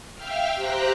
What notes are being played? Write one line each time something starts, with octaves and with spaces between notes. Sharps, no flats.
E5 F5 G5 F6
G4 C5 G5 A#5 F#6